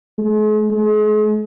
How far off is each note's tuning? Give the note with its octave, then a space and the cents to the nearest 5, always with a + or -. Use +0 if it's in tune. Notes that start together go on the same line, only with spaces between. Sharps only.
G#3 +45
G#3 +40